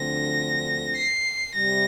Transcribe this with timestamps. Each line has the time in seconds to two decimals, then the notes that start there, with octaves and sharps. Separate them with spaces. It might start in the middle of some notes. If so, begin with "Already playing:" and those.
Already playing: D2 D3 F3 C4 A#6
0.96 C7
1.55 C3 G3 A#6